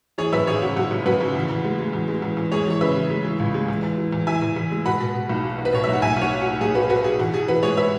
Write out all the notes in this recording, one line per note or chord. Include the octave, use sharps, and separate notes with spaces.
E3 G#4 C#5
F#2 B4 E5
G#1 G#4 C#5
C#3 F#4
F#2 F#4
F#2
F#2 F#4 B4
C#3
E2
E2
G#3
G#3
E2
G#3
E2
E2
G#3 G#4 C#5
E3 C#5
C#3 B4 E5
E3
G#3
E3
C#2
G#3
E2
E2
E3
E2
E3 E5 G#5
E2
E2
G#3
B2 F#5 B5
B2
B2
B1
F#3
B1
B4
B2 C#5
B1 E5
F#5
B1 E5 G#5
B1 C#5 F#5
F#3
B1 F#4
B1 G#4
B2 F#4 B4
B2 F#4 B4
B2 G#4
E2 F#4
E3 G#4
E3 F#4 B4
G#3 G#4 C#5
B4 E5